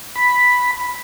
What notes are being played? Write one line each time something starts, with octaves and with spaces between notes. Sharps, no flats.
B5